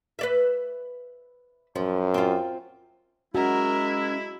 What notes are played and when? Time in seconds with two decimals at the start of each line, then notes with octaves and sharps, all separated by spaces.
0.19 B4 D5 E5
1.75 F#2 F3
2.14 C4 F4
3.35 G#3 C#4 E4 F#4 A#4